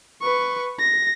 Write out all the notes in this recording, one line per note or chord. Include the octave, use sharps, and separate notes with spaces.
B4 C#6
A#6